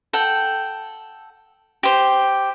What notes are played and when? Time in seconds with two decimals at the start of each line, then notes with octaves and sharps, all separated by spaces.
0.13 A4 F#5 G5
1.83 G4 C5